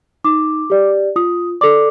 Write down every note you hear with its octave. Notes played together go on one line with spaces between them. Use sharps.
D#4 D6
G4 D5
F4 D#6
A4 D5 D6